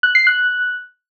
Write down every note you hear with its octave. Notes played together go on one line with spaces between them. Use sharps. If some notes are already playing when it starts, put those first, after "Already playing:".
F#6
C7
F#6